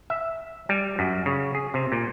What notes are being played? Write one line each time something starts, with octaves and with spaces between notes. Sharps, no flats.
E5
G3
F#2
C#3
G#4
C3
A#2